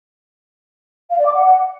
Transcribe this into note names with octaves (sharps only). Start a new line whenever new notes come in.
F5
D5
D6
F#5